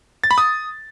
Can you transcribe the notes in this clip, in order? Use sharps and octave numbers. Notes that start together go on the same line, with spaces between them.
A6
B5
D#6